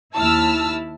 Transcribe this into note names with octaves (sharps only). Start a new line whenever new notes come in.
D#2 E4 A5 E6 F6